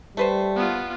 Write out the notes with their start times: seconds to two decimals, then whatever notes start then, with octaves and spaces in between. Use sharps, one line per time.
0.17 G3 A3 B4 C5
0.56 B3 F4